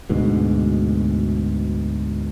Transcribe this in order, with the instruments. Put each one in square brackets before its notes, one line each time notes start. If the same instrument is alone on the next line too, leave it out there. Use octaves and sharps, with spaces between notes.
[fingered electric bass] D2 G#2 B2